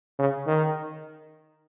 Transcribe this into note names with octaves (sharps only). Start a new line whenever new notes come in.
C#3
D#3